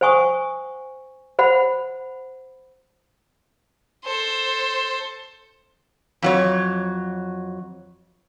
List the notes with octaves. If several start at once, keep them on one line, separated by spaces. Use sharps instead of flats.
C5 F#5 G#5 C#6 D#6
C5 F#5 B5
A4 C5
F2 F#3 C#5